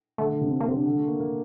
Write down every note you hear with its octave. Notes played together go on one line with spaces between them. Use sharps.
D3 A3
D3
C3 D4
C4
A#3
C3 C4
D4
D3
A3
A#3
A#3